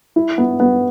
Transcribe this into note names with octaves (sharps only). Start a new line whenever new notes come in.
E4
B3
B3